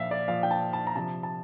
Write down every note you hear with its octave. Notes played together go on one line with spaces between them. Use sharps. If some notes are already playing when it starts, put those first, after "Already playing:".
Already playing: A#2 F3 E5 F5
D5
A#2 F3 F5
G5
A5
A5
A#5
C3 F3 A5
A5